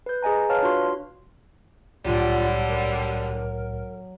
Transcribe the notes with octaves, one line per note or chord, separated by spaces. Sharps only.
B4 G6
G#4 D#5 G#5 A#5
B4 C#5 F5 A5 F6
D4 F4 F#4 C6
C2 A2 D3 F#3 G3 F4
A#4